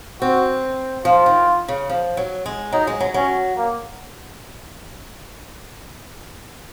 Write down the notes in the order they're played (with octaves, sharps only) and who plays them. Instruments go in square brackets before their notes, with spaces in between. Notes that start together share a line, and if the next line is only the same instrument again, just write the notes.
[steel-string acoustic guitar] C4 [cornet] F#4
[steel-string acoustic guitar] F3 [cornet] F4
[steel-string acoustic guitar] D#3
C#3
F3
F#3
G#3
[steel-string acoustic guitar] F#3 [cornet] D#4
[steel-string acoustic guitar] G#3
F#3
[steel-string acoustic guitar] F#3 [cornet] C#4
[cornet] A#3